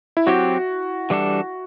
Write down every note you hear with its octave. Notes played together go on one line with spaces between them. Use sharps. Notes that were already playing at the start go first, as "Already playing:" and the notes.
E4
F#3 C4 F#4 G4
E3 G3 D4 A4